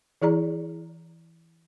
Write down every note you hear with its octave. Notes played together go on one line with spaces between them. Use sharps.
E3 E4 G#4 D5 A#5